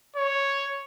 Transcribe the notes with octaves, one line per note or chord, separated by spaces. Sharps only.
C#5